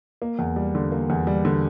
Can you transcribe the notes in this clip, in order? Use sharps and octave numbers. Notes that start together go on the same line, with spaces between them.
A#3
E2
G3
D3
A#3
E2
G3
D3